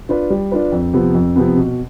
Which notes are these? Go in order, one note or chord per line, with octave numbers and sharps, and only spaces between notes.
D4 F4 B4
G3
D4 F4 B4
F2
C3 F3 B3
F2
C3 F3 B3
B2